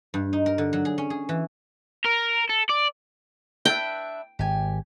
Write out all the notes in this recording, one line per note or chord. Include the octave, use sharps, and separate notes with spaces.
G2
D#4
A#4
D3
F#3
G#4
C#4
G#4
E3
A#4
A4
D5
D4 B4 E5 G5
G#1 G4 G#5